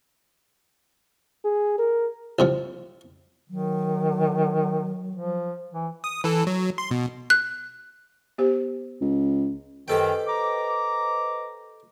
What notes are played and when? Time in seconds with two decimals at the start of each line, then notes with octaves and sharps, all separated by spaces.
1.45 G#4
1.78 A#4
2.39 C2 C3 F3
3.50 D#3 F#3
5.16 F3
5.73 E3
6.04 D#6
6.24 E3 A4
6.47 F#3
6.78 C6
6.91 B2
7.30 F#6
8.38 B3 G4 C5
9.01 C#2
9.88 F#2 D#3 G4 A4 B4 C5 D#5 G5
10.27 A#5 D6